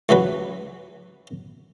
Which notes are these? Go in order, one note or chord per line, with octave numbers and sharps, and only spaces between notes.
C#2 E3 F#3 B4